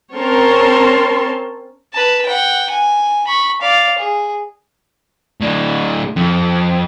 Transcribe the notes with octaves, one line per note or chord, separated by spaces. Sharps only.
C4 C#4 A#4 C#5 A5 C6
B4 A5
F#5 G5
G#5
B5 C#6
D5 F5
G#4
A2 D4
F2